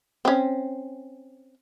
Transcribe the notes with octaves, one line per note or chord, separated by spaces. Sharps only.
C4 C#4